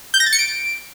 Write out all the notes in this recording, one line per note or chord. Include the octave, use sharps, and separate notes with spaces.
G6
A#6
A6
C#7
D7